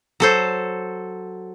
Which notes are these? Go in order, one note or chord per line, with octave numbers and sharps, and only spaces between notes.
F#3 A4 C5